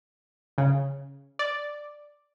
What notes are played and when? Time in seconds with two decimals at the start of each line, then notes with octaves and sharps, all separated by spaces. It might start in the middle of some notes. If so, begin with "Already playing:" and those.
0.58 C#3
1.39 D5